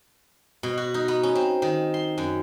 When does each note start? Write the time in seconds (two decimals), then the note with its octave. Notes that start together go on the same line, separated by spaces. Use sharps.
0.63 B2
0.78 F#4
0.94 D#4
1.08 B3
1.23 C#4
1.35 C4
1.62 D#3
1.94 C6
2.18 F#2